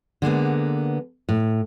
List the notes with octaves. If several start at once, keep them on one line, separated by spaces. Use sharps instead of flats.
D3 G#3 A#3 B3
A2